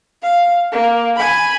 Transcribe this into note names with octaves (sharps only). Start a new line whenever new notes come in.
F5
A#3
G#5 B5